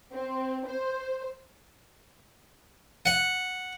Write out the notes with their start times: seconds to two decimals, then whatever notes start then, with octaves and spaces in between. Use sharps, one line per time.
0.12 C4
0.66 C5
3.06 F#5